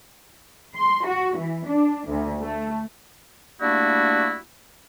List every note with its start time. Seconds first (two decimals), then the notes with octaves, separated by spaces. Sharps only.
0.76 C6
1.07 F#4
1.37 E3
1.67 D4
2.09 D2
2.41 A3
3.60 G3 A3 A#3 D4 E4 F#4